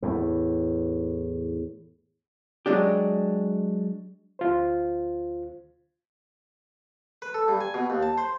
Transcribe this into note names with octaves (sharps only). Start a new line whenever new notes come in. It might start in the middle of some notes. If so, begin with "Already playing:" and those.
E2 A2
F#3 G#3 D4 G4
D2 F4 C5
B4
A4
G2
G#5
B2
D#2
A5
C5